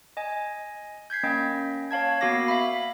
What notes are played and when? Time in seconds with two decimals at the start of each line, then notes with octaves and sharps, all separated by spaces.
0.17 D#5 G#5
1.10 G6 G#6 B6 C7
1.23 A#3 C#4 D#5 G5
1.91 C#5 F5 A5 G#6
2.21 A#3 B3 F#4 F5 D6 A#6
2.48 E5 F5 B5